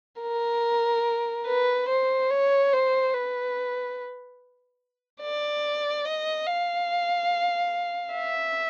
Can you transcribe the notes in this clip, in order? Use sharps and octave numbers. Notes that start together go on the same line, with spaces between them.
A#4
B4
C5
C#5
C5
B4
D5
D#5
F5
E5